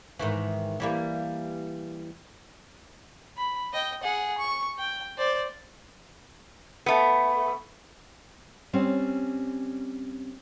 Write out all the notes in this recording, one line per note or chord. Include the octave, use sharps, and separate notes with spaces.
G#2 D#3 E3
E3 G3 A#3
B5
D#5 G5
G#4 F#5
C#6
G5
C5 D5
A3 B3
G3 C4 C#4